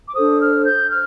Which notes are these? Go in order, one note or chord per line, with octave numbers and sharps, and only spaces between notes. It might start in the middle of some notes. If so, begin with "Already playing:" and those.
D6
D4 A4 C5 D#6
F6
G6
F6